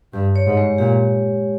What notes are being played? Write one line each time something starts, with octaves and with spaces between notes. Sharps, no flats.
G2 G4
C#5
G#2
G#3
A#2 G4